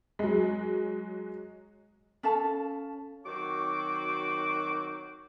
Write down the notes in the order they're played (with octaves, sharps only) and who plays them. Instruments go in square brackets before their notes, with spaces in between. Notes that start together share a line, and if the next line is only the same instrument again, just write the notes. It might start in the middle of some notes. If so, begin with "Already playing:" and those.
[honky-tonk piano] F#3 G#3
[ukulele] C#4 A4 F5 A5
[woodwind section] D#3 F#3 C4 F#4 C#6 D6